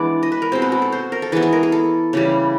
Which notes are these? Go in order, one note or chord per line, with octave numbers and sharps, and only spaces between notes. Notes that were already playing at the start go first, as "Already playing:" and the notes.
Already playing: E3 G#3 B3 D4 D5
D#5
B4
A#4
B2 G#3 C4 C5
B4
F#4
A4
C5
A#4
A4
E3 G#3 B3 G#4
G#4
A#4
G#4
A4
C#3 E3 G3